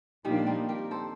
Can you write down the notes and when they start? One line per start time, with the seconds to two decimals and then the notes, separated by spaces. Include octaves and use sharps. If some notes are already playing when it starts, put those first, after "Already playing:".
0.25 A#2 D#3 F3 G3 A#3 D4
0.46 C4 D#4
0.69 G4 A#4
0.91 A4 C5